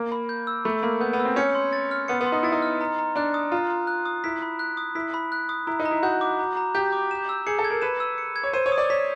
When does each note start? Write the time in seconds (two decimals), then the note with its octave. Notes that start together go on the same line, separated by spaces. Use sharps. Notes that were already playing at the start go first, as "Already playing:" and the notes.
Already playing: A#3
0.12 B5
0.29 G6
0.47 E6
0.65 A3 B5
0.83 A#3 B5
1.00 B3 G6
1.13 B3
1.20 E6
1.25 C4
1.36 C#4 C#7
1.55 C6
1.73 A6
1.91 F6
2.08 B3 C#7
2.21 B3
2.26 C6
2.32 D#4
2.43 E4 A6
2.52 D#4
2.62 F6
2.81 A#5
2.99 A#5
3.16 D4 F#6
3.34 D#6
3.52 F4 A#5
3.70 A#5
3.87 F#6
4.05 D#6
4.24 E4 B6
4.42 B5
4.59 F#6
4.77 D#6
4.95 E4 B6
5.14 B5
5.32 F#6
5.49 D#6
5.67 E4 A#5
5.80 D#4
5.85 A#5
5.91 E4
6.03 F#4 G6
6.21 D6
6.39 A#5
6.57 A#5
6.75 G4 G6
6.93 D6
7.11 E7
7.29 E6
7.47 G#4 C#7
7.59 A4
7.64 G#6
7.70 A#4
7.82 B4 E7
8.00 E6
8.18 C#7
8.36 G#6
8.43 C#5
8.53 C5 D#7
8.66 C#5
8.72 D#6
8.78 D5
8.90 C#5 B6